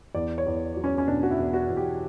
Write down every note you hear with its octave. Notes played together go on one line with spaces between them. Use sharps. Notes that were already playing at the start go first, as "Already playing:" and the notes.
E2 D5
C#5
E2
F#3
C#4
C#4
B2 D4
F#4
E4
E2
F#4
E2
G4